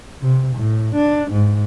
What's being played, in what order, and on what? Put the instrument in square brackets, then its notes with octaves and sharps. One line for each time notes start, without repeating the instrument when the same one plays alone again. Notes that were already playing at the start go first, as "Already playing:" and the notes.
[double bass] C3
A2
D4
G#2